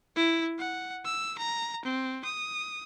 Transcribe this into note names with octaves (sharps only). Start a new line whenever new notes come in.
E4
F#5
E6
A#5
C4
D#6